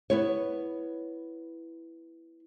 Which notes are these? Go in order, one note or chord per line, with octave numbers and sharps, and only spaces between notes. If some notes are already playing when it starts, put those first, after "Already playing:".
B3 E4 C#5